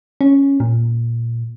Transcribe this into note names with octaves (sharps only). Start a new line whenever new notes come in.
C#4
A#2